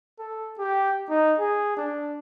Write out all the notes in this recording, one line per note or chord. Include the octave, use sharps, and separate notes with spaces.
A4
G4
D#4
G#4
D4